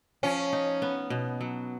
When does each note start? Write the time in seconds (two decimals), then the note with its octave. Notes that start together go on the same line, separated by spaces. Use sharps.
0.23 F3 C#4
0.53 D#4
0.82 B3
1.10 B2
1.41 F#3